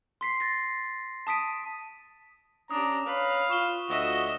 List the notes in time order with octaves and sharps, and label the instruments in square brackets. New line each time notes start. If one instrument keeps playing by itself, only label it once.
[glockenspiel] C6 B6 C7
A6 A#6
A5 D#6 B6 D7 D#7
[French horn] C#4 [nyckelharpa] D4 G4 [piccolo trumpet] A#5 [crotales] D#6
[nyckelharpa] B4 [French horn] C#5 [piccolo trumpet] F5
[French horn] F4 [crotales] C#6 E7 G7
[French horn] D2 [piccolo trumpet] F#4 [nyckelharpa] D#5 E5